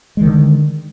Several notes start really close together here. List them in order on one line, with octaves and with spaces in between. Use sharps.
G#3 D#3 D3